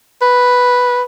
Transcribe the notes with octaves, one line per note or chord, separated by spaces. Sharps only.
B4